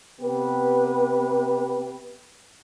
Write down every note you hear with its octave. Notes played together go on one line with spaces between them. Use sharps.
C3 B3 G4 B4